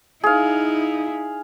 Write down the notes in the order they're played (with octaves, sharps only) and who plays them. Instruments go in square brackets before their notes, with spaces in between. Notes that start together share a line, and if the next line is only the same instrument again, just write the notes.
[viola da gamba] D#4 E4 [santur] G#4 F5